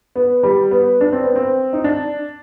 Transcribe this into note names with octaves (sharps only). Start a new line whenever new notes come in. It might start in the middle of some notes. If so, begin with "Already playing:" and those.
B3
G3
B3
D4
C4
B3
C4
D#4
D4